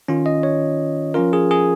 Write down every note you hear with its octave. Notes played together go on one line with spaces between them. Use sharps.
D#3 C#4 F4
D#5
C#5
F3 C#4 F4 A#4
G#4
G#4